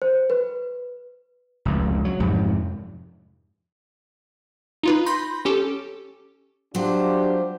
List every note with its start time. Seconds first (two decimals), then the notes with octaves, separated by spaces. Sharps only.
0.02 C5
0.30 B4
1.65 F1 C#2
2.05 F#3
2.20 F2 G#2 C3
4.83 D#4 F4 B4
5.06 B5 C6 G6 A#6
5.45 C#4 G4 A4
6.75 F#3 D4 F4 G4 C5